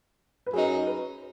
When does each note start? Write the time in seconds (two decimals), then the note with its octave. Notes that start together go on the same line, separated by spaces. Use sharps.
0.46 B4
0.53 F#2 F#3 D#4 G#4
0.87 B4